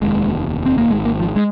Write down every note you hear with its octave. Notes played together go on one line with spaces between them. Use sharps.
F1 D#2 G#3
F1 D#2
C4
A#3
G#1 G#2 G#3
A#3
F3
G#3